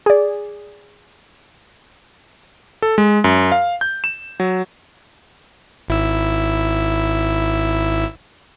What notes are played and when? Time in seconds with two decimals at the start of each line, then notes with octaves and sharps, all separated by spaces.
0.06 G#4 D5
2.82 A4
2.98 G#3
3.24 F#2
3.52 F5
3.81 G6
4.04 E7
4.40 F#3
5.88 G#1 E4 E6